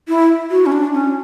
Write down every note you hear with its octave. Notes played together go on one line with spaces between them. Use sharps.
E4
F#4
C#4
D4
C#4